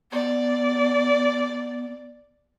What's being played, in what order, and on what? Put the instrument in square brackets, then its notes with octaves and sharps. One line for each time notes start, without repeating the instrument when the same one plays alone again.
[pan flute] B3 [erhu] D5